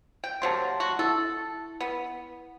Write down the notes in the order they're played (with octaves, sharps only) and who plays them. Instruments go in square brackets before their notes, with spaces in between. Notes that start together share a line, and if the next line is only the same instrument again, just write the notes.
[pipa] G5
[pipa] C3 F#3 A#3 [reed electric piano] A5 C6
[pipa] F#4
[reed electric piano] E4 [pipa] A4
[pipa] B3